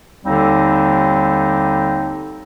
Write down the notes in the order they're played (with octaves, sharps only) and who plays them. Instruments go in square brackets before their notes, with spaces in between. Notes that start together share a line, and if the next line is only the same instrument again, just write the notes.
[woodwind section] D#2 D3 G3 C4 D#4